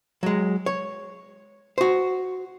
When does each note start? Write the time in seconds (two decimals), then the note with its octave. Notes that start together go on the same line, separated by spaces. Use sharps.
0.23 F#3 G#3
0.66 C#5
1.78 F#4 C5